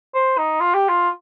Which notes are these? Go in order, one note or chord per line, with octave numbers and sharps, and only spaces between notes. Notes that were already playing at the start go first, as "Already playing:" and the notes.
C5
D#4
F4
G4
F4